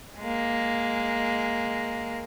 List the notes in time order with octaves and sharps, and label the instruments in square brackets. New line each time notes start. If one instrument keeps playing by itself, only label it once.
[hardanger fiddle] G#3 A#3